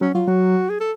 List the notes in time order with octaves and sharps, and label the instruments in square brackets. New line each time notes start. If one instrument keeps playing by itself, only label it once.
[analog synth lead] F#3 [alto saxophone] C#4
[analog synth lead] F#3 [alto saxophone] F4
[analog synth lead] F#3 [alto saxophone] F#4
[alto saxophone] G#4
A4